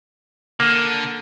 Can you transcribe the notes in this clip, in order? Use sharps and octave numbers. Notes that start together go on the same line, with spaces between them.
D3 A#3